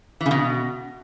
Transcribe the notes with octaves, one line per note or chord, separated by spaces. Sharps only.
E3
C#3
B2